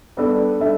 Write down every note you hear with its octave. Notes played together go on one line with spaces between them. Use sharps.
G3 B3 D4 A4 D5
G3 D4 A4 E5